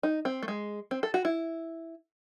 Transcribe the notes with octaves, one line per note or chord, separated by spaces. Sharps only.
D#4
C4
A3
G#3
C4
A4
F#4
E4